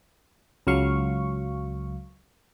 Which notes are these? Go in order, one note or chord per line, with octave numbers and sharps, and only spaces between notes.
C#2 F#3 F5 C#6